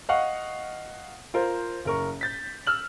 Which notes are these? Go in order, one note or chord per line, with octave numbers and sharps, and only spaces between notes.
D#5 F5 F#5 C#6
F4 A#4 C5
F#1 A#4 C#6
G6 A6 B6
E6 F6 F#7